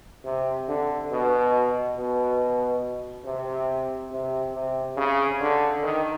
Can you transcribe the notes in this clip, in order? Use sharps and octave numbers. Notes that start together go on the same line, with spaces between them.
C3
D3
B2
B2
C3
C3
C3
C#3
D3
D#3